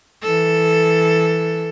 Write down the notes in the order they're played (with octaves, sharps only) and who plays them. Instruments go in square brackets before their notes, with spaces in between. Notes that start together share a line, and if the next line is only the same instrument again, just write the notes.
[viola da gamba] E3 A4